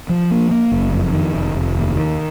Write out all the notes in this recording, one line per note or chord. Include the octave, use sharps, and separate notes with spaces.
F3
A#3
A#3
F#1
F2
D#3
F1
F1
D#2
D#3